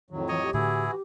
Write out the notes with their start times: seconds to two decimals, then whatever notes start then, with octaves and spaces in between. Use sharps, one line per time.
0.11 F2 A2 D#3 F#3
0.28 E3 C#5 D#5
0.42 G4
0.54 A2 D3 E3 A3 E4 F#4 G#4
0.90 G4